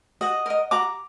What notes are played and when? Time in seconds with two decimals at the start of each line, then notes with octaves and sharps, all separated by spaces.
0.21 F#4 D#5 F#5
0.46 A#4 D#5
0.71 F#4 A#5 D6